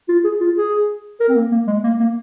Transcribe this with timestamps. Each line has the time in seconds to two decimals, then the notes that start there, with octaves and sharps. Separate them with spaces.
0.09 F4
0.24 G#4
0.40 F4
0.56 G#4
1.20 A#4
1.28 C4
1.35 A#3
1.51 A#3
1.67 G#3
1.84 A#3
1.99 A#3